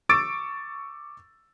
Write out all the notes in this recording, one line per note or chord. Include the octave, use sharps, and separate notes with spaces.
C#6 D6 E6 A6 D7